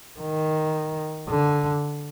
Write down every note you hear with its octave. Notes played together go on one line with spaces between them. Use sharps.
D#3
D3